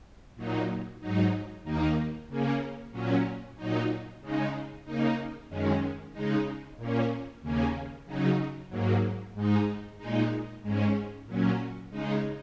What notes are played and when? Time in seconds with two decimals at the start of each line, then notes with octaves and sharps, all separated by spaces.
0.36 A#2 F#3 D#4
1.00 G#2 F#3 D#4
1.64 D#2 D#3 A#3 D#4
2.28 C#3 A#3 C#4
2.91 A#2 F#3 C#4
3.56 A#2 F#3 D#4
4.21 C#3 G#3 D#4
4.85 C#3 A#3 D#4
5.49 F#2 D#3 G#3 C#4
6.12 C#3 G#3 D#4
6.77 A#2 A#3 C#4
7.41 D#2 C#3 A#3 C#4
8.06 C#3 F#3 D#4
8.69 G#2 F#3 A#3
9.34 G#2 G#3 D#4
9.98 A#2 G#3 D#4
10.62 G#2 G#3 C#4
11.26 A#2 F#3 C#4
11.90 C#3 G#3 D#4